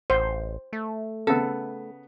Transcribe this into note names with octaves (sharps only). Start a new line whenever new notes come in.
A1 C5
A3
C#3 B3 A4